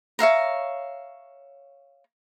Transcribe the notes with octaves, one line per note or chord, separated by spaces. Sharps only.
C#5 E5 F5 A#5